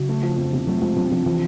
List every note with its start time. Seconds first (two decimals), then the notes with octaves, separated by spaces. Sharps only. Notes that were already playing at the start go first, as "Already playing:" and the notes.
Already playing: C#3 F#3
0.09 A3
0.23 F3
0.37 F2
0.53 C3
0.67 F#3 A3
0.82 F3 G#3
0.96 F2 F#3
1.11 C3 F3
1.26 E3 F3